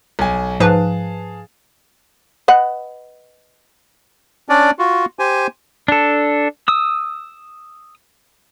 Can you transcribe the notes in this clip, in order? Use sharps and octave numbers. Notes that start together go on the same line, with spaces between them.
B1 G#5
G#2 F3 G#4 B4 F5 A5
B4 D#5 F#5
C#4 D4 D5
F4 F#4
G4 C5 G#5
D4 A4
D#6 E6